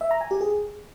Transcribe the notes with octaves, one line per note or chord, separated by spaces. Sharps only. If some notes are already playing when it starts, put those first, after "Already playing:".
E5
A#5
G#5
G4
G#4